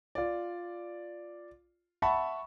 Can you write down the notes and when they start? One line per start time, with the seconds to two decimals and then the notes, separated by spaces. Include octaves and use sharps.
0.15 F4 D5
2.02 E5 F#5 A5 B5 C#6